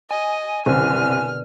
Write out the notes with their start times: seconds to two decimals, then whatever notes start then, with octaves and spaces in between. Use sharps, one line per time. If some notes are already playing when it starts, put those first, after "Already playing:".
0.11 D#5 G#5
0.66 C2 F#2 B2 D3 C4 F6